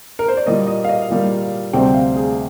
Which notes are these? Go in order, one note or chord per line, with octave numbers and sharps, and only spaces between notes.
A#4
C5
D5
A#2 G3 A#3 D#5
D#5
F5
D#5
A#2 G3 A#3
D2 C3 G3 C4 G5
F5
G#4